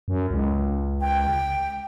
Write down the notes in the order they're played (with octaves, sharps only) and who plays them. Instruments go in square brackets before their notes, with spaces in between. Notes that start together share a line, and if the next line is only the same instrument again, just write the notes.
[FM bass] F#2
C#2
[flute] G5